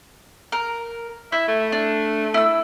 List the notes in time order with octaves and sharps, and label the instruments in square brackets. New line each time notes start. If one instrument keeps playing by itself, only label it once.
[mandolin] A#4
[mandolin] E4 [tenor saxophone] E5
[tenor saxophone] A3
[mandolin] D4
E4 E6